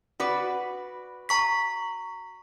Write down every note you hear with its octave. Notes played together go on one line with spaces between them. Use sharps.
F#4 B4 D5
A#5 C#6 B6